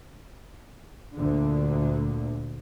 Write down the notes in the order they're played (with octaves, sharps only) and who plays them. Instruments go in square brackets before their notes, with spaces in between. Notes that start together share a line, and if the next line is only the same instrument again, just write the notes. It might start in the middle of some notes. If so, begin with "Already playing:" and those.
[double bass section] D2 A#2 D3